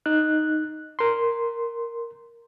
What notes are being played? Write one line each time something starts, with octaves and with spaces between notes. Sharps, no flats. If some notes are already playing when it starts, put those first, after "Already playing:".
D#4 F#6
A#4 C6